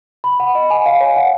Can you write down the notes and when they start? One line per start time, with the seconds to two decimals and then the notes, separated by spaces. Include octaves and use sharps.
0.24 B5
0.40 F#5
0.55 D#5
0.70 G#5
0.86 F5
1.01 C#5
1.16 F#5